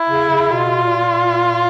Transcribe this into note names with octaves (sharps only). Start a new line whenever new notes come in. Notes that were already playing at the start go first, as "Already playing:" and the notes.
Already playing: E4
C#3
C#3
B2 F4
A#2